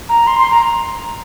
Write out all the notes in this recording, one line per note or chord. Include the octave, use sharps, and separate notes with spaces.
A#5
C6
C6
A#5